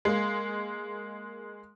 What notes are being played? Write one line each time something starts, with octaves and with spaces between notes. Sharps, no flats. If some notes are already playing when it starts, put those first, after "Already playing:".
G#3 A#3